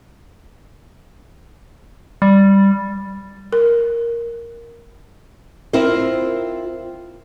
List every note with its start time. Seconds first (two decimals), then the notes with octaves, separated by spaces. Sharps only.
2.22 G3
3.53 A#4
5.73 C4 E4 F4 A#4 C5